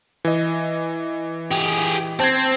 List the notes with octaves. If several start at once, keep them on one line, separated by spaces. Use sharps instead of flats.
E3 D#5
G4 G#4
C4 A5 G6 G#6